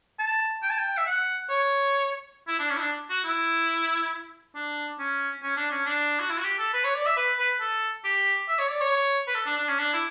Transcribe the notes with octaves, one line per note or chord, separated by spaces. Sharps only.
A5
G5
A5
G5
E5
F#5
C#5
E4
D4
C#4
E4
D4
F#4
E4
D4
C#4
C#4
D4
C#4
D4
F#4
E4
F#4
G4
A4
B4
C#5
D5
E5
B4
B4
A4
G4
E5
C#5
D5
C#5
B4
A4
D4
D4
C#4
D4
E4